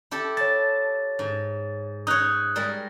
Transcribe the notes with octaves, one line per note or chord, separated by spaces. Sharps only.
E4 G4 A4
C#5 A5 A6
G#2
D#4 C#5 D#6 F#6
G3 G#3 A#4